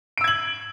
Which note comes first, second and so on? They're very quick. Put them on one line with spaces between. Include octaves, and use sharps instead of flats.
D7 E6 G#6 F#7